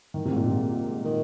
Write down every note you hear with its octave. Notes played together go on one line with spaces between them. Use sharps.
D#3
C3
G#2
A#2
C3
D#3